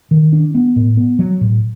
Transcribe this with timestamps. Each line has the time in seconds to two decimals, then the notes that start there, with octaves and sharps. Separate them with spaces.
0.11 D#3
0.33 D4
0.55 B3
0.76 A2
0.97 B3
1.19 F#3
1.41 A2